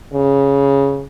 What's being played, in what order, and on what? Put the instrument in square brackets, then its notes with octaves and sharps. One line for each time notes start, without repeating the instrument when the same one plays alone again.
[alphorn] C#3